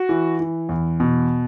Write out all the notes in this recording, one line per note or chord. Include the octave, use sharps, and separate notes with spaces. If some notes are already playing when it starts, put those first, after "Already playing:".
Already playing: F#4
E3
E3
E2
B2